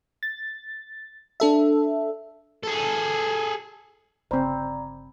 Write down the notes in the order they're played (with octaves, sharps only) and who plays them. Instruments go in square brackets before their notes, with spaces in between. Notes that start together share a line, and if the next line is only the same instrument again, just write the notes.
[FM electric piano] A6
D4 A4 E5
[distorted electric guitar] G#4 A4
[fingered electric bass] G1 C#3 [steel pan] C4 C5 [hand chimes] D5 A#5 B5